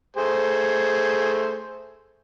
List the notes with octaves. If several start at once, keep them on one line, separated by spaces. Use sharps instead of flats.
A3 G#4 C5